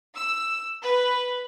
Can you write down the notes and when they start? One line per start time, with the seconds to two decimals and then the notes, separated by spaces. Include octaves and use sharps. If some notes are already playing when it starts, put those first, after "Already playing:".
0.16 E6
0.82 B4